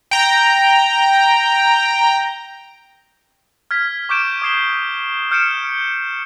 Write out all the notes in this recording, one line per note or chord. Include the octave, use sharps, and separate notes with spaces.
G5 A#5
F6 G#6 B6
C#6 D6 F6 G6 D7 E7
D6 D#6 G#6 C7 E7 G7
F6 G6 C#7 D7 E7